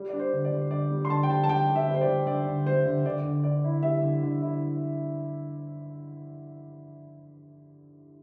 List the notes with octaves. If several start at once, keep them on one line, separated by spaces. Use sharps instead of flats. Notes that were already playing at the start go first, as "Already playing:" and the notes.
Already playing: G3
D4 D5
C5
D3
D5
G3
D3 D5
G3
C6
D3 A5
G5
G3 A5
A5
G3 G5
G3
E5
G3
C5
D5
G3
D3 D5
D3
G3 C5
D3
D3 D5
D3
D3 D5
E4
G3 E5
D3
D3
E4